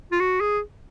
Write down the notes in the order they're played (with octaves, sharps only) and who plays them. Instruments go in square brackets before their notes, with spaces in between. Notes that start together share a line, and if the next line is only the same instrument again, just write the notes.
[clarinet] F4
F#4
G#4